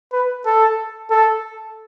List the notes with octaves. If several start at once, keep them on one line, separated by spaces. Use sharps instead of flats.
B4
A4
A4